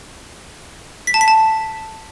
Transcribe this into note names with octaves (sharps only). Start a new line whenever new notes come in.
B6
A5
B6
A5